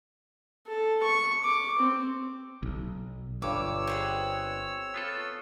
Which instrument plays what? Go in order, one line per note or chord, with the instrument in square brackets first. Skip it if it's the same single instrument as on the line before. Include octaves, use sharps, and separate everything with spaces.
[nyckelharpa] A4
C#6
D6
C4
[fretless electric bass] B1
[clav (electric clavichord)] G1 G2 [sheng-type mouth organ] C#5 E6 [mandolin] D6
[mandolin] C4 G#4 F#5
[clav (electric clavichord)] B3 F4 A4